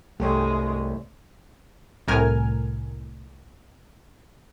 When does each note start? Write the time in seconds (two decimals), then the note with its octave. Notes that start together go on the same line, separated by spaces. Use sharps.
0.20 C2 G2 G#3 A3 G4 A4 C#5
2.08 C2 A2 A#4 G#5 F6